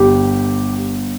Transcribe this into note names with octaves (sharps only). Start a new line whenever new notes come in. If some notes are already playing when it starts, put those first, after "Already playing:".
Already playing: G1 G4